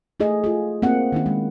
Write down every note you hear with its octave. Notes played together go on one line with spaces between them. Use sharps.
A3 E4 G#4 D#5
F4 G#4
A#3 C4 F#5
D#3 C#4 E4
G#3